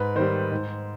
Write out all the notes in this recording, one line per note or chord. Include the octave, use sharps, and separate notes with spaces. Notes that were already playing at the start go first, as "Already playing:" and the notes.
Already playing: G#2 B4
D#3 G3 C5
G#2